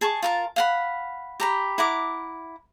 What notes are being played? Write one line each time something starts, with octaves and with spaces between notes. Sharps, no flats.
G#4 A5 C#6
F4 A#4 A5
F5 F#5 B5
G4 A#5 B5
E4 F#5 A#5 D6